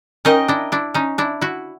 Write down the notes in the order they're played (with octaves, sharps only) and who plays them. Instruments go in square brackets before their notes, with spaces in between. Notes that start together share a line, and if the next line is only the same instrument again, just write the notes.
[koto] C#4 D#4 [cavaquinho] A#4 D#5 G5
[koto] D4 E4
D4 E4
C#4 D#4
D4 E4
E4 F#4